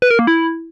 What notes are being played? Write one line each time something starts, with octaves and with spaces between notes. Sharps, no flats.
B4
A#4
A#3
E4